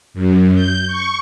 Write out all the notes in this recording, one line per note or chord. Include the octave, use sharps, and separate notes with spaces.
F#2
G6
C#6